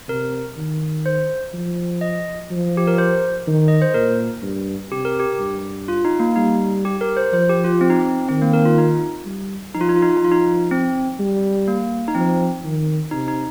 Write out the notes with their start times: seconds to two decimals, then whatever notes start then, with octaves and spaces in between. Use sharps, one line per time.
0.08 C3 A#4
0.56 D#3
1.06 C5
1.54 F3
2.01 D#5
2.51 F3
2.77 G4
2.87 A#4
2.98 C5
3.47 D#3
3.68 D#5
3.82 C5
3.94 A#2 A#4
4.43 G2
4.92 C3 G4
5.05 A#4
5.20 G4
5.39 G2
5.88 F4
6.05 D#4
6.20 A#3
6.36 G3 D#4
6.85 G4
7.01 A#4
7.17 C5
7.33 F3 C5
7.49 G4
7.64 F4
7.81 C4
7.90 D#4
8.01 C4
8.29 D#3 C4
8.41 A#3
8.53 A#4
8.65 F4
8.78 D#4
9.25 G3
9.74 F3 D#4
9.81 F4
9.89 D#4
9.96 F4
10.02 D#4
10.10 F4
10.17 D#4
10.23 F3 F4
10.32 D#4
10.71 C4
11.19 G3
11.68 A#3
12.08 D#4
12.15 F3 C4
12.64 D#3
13.11 C3 D#4
13.28 D#4